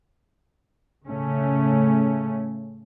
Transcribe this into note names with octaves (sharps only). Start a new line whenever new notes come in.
A2 C#3 A3 C#4